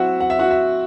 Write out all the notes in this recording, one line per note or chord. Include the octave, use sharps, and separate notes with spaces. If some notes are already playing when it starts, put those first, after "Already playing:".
Already playing: F#3 C4 E4 F#4 E5 F#5
F#5
E5
F#4 F#5
E5